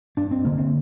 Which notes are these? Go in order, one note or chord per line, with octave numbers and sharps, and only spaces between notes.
G2 D4
C4
D3 A#3
C4